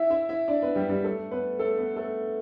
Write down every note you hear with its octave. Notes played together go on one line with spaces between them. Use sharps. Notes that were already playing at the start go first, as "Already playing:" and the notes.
Already playing: E4 E5
E4 E5
E4 E5
D4 D5
B3 B4
G3 G4
G3 G4
A3 A4
B3 B4
A3 A4
B3 B4
A3 A4